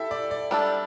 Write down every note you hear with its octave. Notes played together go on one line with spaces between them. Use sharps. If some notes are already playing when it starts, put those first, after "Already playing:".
Already playing: E4 G4 A4 E5
D5
D5
G3 D4 A4